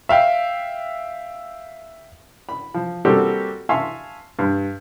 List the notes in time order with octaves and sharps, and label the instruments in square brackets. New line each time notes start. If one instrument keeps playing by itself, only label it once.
[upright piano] E5 F5 G5
[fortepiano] B5
F3
G3 A#3 C4 F#4 G4 A4
E5 F5 G#5 A5 C6 C#6
G2